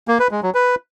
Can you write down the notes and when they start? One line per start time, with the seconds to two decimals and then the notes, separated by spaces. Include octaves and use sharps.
0.08 A#3
0.20 B4
0.31 G#3
0.43 F#3
0.54 B4